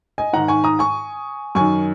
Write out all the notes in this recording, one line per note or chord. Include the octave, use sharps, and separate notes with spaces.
D#5 G#5
G#2 D#3 F#5 A#5
G#5 C#6
A#5 D#6
G#5 C#6
F#2 D#3 G#5 C#6